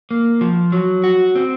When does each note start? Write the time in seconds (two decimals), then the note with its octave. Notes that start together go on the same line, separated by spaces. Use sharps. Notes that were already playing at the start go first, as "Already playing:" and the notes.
0.11 A#3
0.41 F3
0.72 F#3
1.04 F#4
1.35 C4